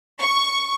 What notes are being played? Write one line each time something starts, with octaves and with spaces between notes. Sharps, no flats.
C#6